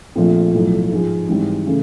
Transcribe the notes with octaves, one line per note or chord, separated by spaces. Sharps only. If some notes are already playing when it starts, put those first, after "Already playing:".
A#1 A#2 F3 A3 C4
B1 A2 F3
G#2 F3 G#3
G#2 E3 G3 C4
C#3 E3 A3